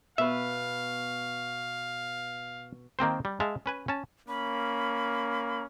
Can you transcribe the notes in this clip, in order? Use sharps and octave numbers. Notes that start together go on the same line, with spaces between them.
B2 B4 E5 F5
D#3 A#3 C4 C5
G3
G#3 E5 F5 A5
C#4 B4 G#5
C#4 A5
A#3 C#4 B5